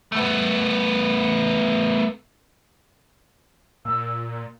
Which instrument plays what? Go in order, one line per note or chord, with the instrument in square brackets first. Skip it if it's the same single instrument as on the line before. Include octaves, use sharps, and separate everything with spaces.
[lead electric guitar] A3 B3
[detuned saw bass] A#2 [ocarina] E6